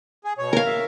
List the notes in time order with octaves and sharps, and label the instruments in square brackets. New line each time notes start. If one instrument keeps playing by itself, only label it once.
[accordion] G#4
B2 C#5
[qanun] A#4 F5
[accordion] E5